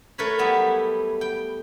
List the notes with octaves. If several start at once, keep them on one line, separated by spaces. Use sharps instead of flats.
A3 A#4 B4 C#5 B5
F#3 G3 B3 E4
G5